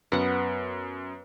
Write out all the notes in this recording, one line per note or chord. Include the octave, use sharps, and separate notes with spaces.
F#2 B3 F#5